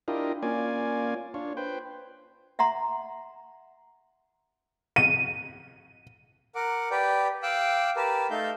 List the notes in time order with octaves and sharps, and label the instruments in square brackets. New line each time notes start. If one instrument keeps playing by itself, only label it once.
[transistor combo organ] D4 E4 F4 G4 A#4 D#5
A#3 C#4 F4 D5 G#5
D4 F4 C#5
B4 C5 G5
[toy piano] E5 F#5 A#5 C6
[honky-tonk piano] D#7
[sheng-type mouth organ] A#4 F#5 D6
G4 B4 D5 G5
F5 G5 D6 E6 F#6
G4 A#4 B4 A5
A3 D#4 A4 F5 G6